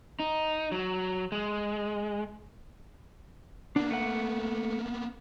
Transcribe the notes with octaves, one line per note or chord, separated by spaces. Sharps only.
D#4
F#3
G#3
A#3 B3 D4
A3 F#5